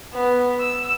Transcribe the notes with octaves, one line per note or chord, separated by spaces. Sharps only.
B3
E6